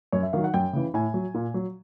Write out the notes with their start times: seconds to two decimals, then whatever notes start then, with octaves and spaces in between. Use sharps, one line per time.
0.12 F#2 C#5
0.23 E5
0.33 D#3 F#3 F5
0.44 F#5
0.54 F#2 G5
0.73 C#3 E3
0.94 A2 G#5
1.14 F#3
1.34 A#2
1.54 F#3